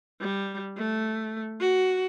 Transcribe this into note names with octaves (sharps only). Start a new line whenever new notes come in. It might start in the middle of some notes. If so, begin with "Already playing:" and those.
G3
A3
F#4